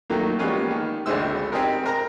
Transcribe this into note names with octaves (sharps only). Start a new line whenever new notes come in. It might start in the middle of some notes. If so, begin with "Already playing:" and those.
D#3 F#3 A3 A#3
G3 G#3 A#3 B3 C#4 F4
D#3
G#1 C#2 D3 G#3 C5 E6
C4 D#4 G4 G#4 A#4
C4 A#4 A#5